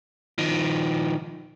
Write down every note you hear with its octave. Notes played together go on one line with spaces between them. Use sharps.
D#3 F3